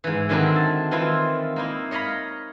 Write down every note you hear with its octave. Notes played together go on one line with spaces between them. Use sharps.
G#2 E3
D3 D#3 F#3 C4 D4 E4
A5
D#3 E3 C4 E4 F4
A#3 D#4 E4
C#5 D#5 F5 A#5 B5